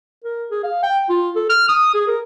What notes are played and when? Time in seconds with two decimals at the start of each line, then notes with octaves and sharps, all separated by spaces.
0.24 A#4
0.51 G#4
0.63 F5
0.83 G5
1.09 F4
1.36 A4
1.49 F6
1.69 D#6
1.94 G#4
2.08 A#4